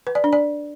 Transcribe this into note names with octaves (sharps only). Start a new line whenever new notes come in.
B4
D5
D4
D5